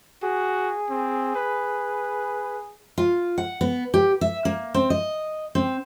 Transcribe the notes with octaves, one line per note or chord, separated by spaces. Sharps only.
F#4 G#4
C4
B4
F4
F#5
B3
G4
E5
A#3
C4
D#5
C4